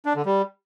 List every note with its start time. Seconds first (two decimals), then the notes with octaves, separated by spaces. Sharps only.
0.05 D4
0.15 D3
0.25 G3